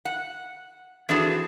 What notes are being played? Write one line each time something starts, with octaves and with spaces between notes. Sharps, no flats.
F#5
E3 C4 D4 F#4 G#4 A4